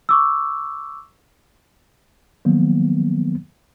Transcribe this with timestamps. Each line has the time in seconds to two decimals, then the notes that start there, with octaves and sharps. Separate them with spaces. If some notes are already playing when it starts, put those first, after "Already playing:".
0.09 C#6 D6 E6
2.45 D#3 F3 F#3 A#3 B3